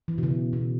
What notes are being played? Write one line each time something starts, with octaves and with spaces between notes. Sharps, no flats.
E3
B2
C#3
B2